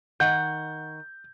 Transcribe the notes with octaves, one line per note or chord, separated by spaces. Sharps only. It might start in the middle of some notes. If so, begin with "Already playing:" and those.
D#3 F#5 G6